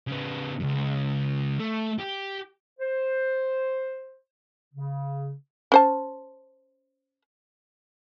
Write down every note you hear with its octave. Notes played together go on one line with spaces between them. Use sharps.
C#3 B3
C#2 F#2
A3
G4
C5
C#3
C#4 C5 A5